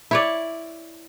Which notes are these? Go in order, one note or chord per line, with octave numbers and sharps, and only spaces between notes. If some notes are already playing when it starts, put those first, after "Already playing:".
E4 C#5 D5